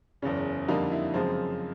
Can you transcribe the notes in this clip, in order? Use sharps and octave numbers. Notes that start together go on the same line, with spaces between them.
F#1 E2 C#3 C#4
F2 D3 G3 A#3 D#4
E4
F#2 C#3 F3 G#3 C4